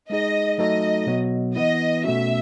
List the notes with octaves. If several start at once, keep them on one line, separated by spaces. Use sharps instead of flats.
G#3 D#4 G#4 D#5
F#3 A3 D#4 F#4 A4 D#5
B2 F#3 B3
E3 B3 E4 D#5
B2 A3 C#4 F#4 E5